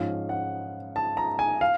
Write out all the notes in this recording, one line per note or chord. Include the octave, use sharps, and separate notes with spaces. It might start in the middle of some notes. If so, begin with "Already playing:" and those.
Already playing: G#2 F3 G#3 C#4 F5
F#5
A5
A#5
G#5
F5